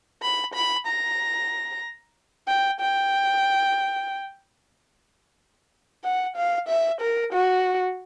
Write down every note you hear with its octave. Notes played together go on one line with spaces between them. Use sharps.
B5
B5
A#5
G5
G5
F#5
F5
E5
A#4
F#4